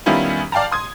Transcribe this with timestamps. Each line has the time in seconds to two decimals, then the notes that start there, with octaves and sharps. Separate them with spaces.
0.06 D#3 G3 B3 C#4 E4 F4
0.52 D5 F5 G5 A5 A#5
0.71 C6 D#6 G#6